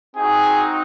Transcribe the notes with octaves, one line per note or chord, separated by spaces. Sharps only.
C4 D#4 F#4 G#4